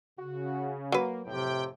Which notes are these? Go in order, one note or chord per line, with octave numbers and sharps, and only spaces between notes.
C#3 F#4
F#3 A#3 B4
F2 A2 C3 G5